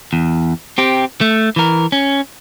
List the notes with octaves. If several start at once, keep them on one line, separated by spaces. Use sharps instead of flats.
E2
C4 G4
A3
E3 A#4
C#4